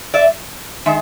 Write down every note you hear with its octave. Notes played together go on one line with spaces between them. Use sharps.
D5 E5
D#3 G#3 E5